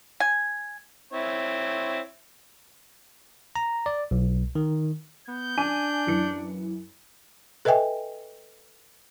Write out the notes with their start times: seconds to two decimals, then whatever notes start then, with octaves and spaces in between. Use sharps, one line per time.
0.20 G#5
1.12 C4 E4 C#5
3.56 A#5
3.86 D5
4.11 B1
4.55 D#3
5.28 B3 G6
5.58 D4 G#5 D#7
6.07 F#2 E3 C#7
7.65 A4 B4 D#5 E5 G5 G#5